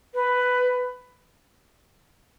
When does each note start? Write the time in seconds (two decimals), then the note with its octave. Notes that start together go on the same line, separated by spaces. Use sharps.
0.14 B4